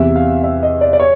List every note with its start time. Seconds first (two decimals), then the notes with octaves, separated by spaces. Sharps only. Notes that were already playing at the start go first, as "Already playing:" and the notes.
Already playing: E2 C3 E3 E5
0.16 F5
0.44 E5
0.63 D#5
0.81 D5
0.93 D5
1.00 C#5